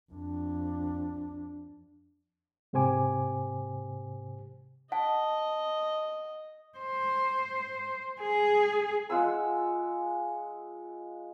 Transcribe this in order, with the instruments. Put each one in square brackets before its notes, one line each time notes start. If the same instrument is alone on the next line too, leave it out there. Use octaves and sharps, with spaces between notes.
[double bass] F2 D4
[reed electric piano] G#2 C3 G4 C5 G#5 D6
[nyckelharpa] D#5 [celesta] F#5 A5
[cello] C5
G#4
[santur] G#3 F4 F#5 E6